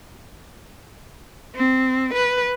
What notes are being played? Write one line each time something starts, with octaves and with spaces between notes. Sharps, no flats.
C4
B4